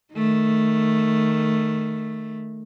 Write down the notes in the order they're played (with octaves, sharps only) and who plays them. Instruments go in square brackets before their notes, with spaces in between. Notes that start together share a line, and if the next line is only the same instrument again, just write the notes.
[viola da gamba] D#3 A3